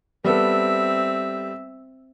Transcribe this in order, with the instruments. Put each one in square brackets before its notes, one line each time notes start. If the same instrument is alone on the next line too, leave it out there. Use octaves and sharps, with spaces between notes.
[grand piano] G3 B3 A4 [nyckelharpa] C4 E5